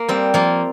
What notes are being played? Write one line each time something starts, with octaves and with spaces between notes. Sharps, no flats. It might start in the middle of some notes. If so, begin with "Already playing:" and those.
Already playing: A#3
G3 C4
F3 A#3